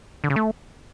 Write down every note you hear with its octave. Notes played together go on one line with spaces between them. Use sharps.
D3
C#3
A3